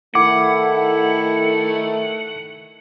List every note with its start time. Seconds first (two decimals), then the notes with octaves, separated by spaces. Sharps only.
0.15 D#3 A3 E4 F#5 D6